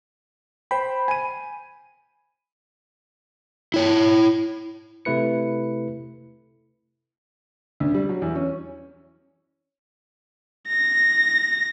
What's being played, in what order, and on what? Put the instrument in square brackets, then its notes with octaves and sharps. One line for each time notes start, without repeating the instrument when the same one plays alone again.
[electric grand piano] C5 G5 [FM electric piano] B5
[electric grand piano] G#5 D#7
[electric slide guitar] E4 C#5
[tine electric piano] C3 A3 E4 B4 C#7
[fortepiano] D2
G3
F#3
E2
C#4
[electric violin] A#6